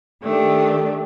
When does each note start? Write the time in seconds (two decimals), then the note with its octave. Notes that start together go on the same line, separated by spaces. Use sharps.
0.23 D#3 A3 D4 G4